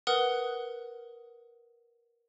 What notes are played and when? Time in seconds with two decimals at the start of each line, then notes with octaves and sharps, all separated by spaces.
0.07 A#4 B4 F#5 D#6 F#6